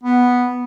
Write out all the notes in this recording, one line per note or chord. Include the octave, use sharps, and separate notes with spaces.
B3